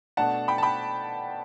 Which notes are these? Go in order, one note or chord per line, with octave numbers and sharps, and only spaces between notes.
B2 A3 D4 F#5 A5
G5 B5
A5
G5 B5